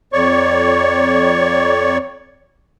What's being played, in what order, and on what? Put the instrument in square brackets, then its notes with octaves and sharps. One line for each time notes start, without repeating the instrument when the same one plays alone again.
[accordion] F2 C#5 D5 C#6